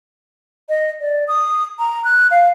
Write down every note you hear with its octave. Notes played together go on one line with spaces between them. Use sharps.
D#5
D5
D#6
A#5
F#6
F5